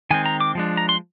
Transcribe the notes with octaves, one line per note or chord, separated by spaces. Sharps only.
D#3 G#3 C4 G#5
A#5
D6
F3 G#3 D4
A#5
C6